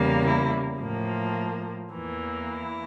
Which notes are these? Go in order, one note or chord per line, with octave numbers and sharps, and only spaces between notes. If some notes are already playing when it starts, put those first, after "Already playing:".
Already playing: E2 C#3 G3 A#3
E4
A2 F3 A#3
E2 E3 A#3
E4